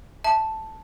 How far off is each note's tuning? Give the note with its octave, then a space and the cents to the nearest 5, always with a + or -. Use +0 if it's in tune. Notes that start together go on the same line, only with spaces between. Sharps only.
E5 -5 A5 +0